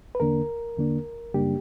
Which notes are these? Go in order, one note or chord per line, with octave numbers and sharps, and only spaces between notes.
B4
E2 D3 A#3 D4 A#4
E2 D3 A#3 D4
F#2 C#3 G3 A#3 D4 G4